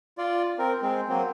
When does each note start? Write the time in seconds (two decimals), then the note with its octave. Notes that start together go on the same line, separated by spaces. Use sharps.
0.18 F4 D5
0.59 C4 A#4
0.82 G#3 C4
1.09 F#3 A#3 C4